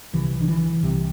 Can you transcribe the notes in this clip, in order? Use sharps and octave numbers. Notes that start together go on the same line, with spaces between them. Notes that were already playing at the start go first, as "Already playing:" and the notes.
C2 C3 E3
D3
E3
C2 C3